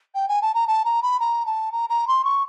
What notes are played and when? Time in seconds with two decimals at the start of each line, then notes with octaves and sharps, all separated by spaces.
0.15 G5
0.28 G#5
0.42 A5
0.54 A#5
0.67 A5
0.85 A#5
1.02 B5
1.20 A#5
1.46 A5
1.72 A#5
1.89 A#5
2.07 C6
2.24 C#6